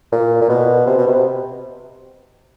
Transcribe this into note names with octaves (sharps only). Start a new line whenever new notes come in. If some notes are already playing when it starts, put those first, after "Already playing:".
A#2
A#2
B2
C3
B2
C3